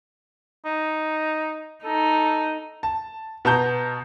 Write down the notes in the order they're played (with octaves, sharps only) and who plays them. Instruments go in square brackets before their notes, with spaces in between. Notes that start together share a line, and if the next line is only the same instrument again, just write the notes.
[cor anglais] D#4
[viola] D#4 [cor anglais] A4
[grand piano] A5
B2 A5 A#5 G6